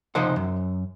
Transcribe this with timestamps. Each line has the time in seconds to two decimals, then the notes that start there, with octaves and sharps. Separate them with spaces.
0.15 C#2 C3 F3 D#4 C5 F#5
0.36 F#2